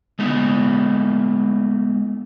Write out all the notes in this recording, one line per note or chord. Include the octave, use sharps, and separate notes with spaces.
G#3 A3 B3 D#4